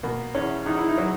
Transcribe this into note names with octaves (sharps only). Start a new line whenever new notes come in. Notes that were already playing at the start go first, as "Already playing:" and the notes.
B2 A#3
E2 C#4
E2 D#4
E4
D#4
F#3